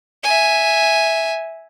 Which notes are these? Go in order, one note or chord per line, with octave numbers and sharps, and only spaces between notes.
E5 G#5